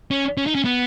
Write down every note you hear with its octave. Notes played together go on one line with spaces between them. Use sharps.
C#4
C#4
D#4
C#4
B3